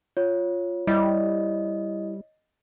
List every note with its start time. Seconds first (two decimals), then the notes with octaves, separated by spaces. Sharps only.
0.17 F4 C#5
0.87 G3 E4 D#5